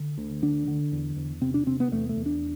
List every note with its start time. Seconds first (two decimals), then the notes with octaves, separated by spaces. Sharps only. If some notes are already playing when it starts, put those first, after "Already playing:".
Already playing: D3
0.18 D2
0.42 D3 D4
0.68 D3
0.92 E2
1.16 E2
1.41 C3 C4
1.54 D4
1.66 C3 C4
1.80 B3
1.92 E2 A3
2.09 A3
2.16 E2
2.26 D4